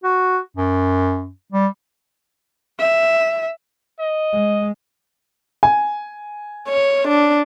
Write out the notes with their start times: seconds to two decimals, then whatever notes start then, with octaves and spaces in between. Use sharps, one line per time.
0.04 F#4
0.57 F#2
1.52 G3
2.79 E5
3.99 D#5
4.32 G#3
5.63 G#5
6.69 C#5
7.08 D4